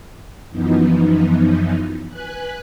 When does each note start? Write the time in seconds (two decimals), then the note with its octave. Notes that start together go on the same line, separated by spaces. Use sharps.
0.50 F#2 E3 F3 B3 D#4
2.08 B4 G#5 F#6